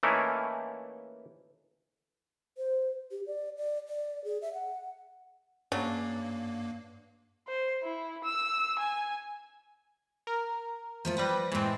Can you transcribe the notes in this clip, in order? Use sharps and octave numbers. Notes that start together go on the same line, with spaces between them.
E3 A3 A#3 C#4 D#4 E4
C5
G4
D5
D5
D5
G#4
E5
F#5
G2 C#3 F#3 A#3 D4
C5
E4
E6
G#5
A#4
F3 A3 F4
F3 G3 B4 G5 A#6
A2 E3 G#3 C4